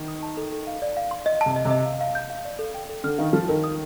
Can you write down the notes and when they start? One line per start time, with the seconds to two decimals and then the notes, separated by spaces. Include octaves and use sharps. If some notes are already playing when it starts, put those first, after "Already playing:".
Already playing: D#3
0.08 D#6
0.23 A5
0.37 A4
0.52 A4
0.67 F5
0.82 D5
0.97 F5
1.11 C6
1.26 D#5
1.41 C3 A5
1.56 D#5
1.65 C3
1.71 D#5
1.85 F5
2.01 F5
2.15 G6
2.30 F5
2.45 D5
2.59 A4
2.74 G5
2.89 A4
3.04 D3 F6
3.18 D#3 F5
3.33 F3 F6
3.48 D#3 A#4
3.64 D#6